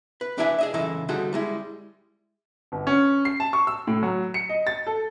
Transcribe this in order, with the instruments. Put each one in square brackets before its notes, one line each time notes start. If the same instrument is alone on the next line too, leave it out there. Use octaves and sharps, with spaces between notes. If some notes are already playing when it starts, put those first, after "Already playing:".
[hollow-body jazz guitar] B4
D4 E4 B4 D5 E5 G#5
G#4 D#5 E5
C#2 C#3 E3 E4 A4 D#5
D3 G3 D#4 F#4 G#4 A4
G3 G#3 E4
[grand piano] G1
C#4
C7
A5
C#6
E6
A2
F#3
C#7
D#5
A6
A4